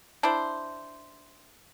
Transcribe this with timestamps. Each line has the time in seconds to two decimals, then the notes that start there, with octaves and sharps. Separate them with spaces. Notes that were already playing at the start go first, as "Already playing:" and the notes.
0.23 D4 E4 C5